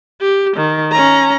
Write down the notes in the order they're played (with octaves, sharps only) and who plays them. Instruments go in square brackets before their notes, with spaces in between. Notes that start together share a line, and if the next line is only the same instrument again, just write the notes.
[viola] G4
D#3
C#4 A#5